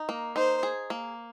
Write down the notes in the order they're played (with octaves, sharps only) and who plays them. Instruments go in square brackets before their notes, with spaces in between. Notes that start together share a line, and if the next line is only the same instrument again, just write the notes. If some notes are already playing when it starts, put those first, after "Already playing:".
Already playing: [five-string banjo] D#4
A#3
[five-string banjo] D#4 [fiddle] C5
[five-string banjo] G#4
A#3